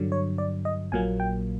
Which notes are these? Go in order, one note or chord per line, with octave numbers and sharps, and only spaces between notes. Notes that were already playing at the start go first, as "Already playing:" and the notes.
Already playing: G2 D3 F#3
C#5
D5
D#5
A#1 A#2 F#3 A#3 G#5
G5